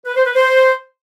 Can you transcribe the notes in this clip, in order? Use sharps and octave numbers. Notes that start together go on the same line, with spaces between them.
B4
C5
B4
C5